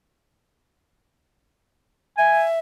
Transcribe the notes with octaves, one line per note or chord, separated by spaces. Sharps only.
E5 G#5